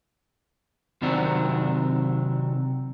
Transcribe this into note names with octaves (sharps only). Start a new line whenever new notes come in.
C3 D#3 F#3 C4 D4